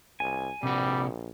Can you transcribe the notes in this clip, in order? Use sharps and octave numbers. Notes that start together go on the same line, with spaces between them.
C2 G#5
A#1 C3 G3 F#4